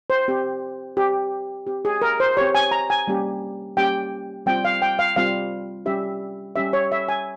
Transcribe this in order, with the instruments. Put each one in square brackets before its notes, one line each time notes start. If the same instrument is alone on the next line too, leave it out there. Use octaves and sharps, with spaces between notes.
[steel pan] C5
C4 G4
C4 G4
C4 G4
G#4
A#4
C5
C4 G4 C#5
G#5
A#5
G#5
G3 A#3 C#4 G4
G3 A#3 C#4 G4 G5
G3 C4 F4 G5
F5
G5
F5
G3 C4 F4 F5
G3 C#4 G4 E5
G3 C#4 G4 E5
C#5
E5
G#5